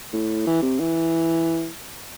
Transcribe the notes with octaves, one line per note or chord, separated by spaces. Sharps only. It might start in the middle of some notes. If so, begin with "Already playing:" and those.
A2
E3
C3
E3